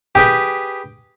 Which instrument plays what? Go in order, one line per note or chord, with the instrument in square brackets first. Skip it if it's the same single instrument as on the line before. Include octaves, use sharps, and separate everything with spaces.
[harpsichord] G4 G#4 B4 [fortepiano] G5